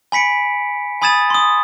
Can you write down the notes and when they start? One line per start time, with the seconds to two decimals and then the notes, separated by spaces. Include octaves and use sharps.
0.12 G#5 B5 B6 C#7 D7
1.02 G#5 B5 D#6 G#6 A6 E7
1.30 C6 D#6